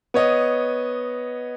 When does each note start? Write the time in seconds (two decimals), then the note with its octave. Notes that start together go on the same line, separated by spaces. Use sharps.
0.14 B3 C#5 D#5